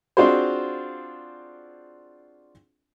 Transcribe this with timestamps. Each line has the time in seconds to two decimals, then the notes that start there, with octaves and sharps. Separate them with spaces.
0.17 C4 D4 F4 F#4 G#4 C5